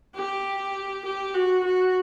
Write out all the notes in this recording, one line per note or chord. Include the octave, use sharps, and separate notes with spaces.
G4
G4
F#4
F#4